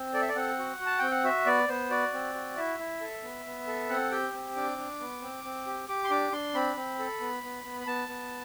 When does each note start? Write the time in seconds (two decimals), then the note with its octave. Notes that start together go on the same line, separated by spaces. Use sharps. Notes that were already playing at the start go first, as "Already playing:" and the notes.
Already playing: C4
0.14 A4 D5
0.22 E5
0.29 D5
0.36 C4 F#5
0.59 F#4
0.80 F#4
0.86 A5
0.99 C4 G5
1.11 F#5
1.24 F#4 E5
1.46 B3 D5
1.68 B3 C5
1.91 F#4 D5
2.13 C4
2.35 F#4
2.56 E4 E5
2.79 E4
3.01 A4
3.23 B3
3.46 B3
3.67 A4
3.89 C4 F#5
4.11 G4 G5
4.33 C4
4.56 D4 D6
4.78 D4
5.01 B3
5.22 C4
5.44 C4
5.66 G4
5.88 G4 D6
6.04 C6
6.10 D4 D6
6.32 D4 C6
6.55 C4 B5
6.77 C4
6.99 A4
7.20 B3
7.43 B3
7.64 B3
7.80 B5
7.87 B3 A5
8.09 B3